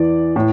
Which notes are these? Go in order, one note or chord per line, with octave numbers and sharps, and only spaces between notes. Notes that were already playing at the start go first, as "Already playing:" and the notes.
Already playing: E2 E3 D5
A2